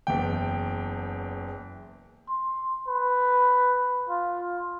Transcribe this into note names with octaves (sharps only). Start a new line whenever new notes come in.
F#1 E2 G5
C6
B4
F4